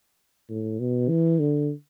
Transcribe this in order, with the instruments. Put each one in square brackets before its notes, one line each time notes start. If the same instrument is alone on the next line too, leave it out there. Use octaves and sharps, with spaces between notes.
[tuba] A2
B2
E3
D3